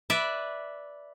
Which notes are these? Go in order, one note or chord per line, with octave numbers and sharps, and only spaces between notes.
B4 D5 E5